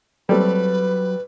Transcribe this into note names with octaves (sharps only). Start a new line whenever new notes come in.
F#3 G3 A3 C4 B4